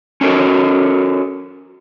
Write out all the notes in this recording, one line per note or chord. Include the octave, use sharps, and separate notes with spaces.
C#4 F#4 A4 A#4